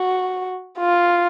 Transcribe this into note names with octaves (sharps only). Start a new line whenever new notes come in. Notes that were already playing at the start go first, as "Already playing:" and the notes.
Already playing: F#4
F4